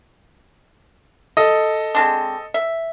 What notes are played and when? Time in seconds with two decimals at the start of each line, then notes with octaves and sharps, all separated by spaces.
1.37 A4 D#5
1.95 G#3 C4 D4
2.54 E5